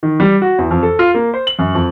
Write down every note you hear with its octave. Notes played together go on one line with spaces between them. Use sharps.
D#3
G3
F#4
E2
F2
A4
F4
A#3
C5
F#7
F#2
F2